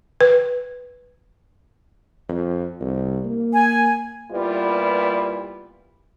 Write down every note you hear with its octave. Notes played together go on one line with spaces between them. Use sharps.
B4
F2
C2
A#3
G#5
A#2 G3 B3 E4 F4 B4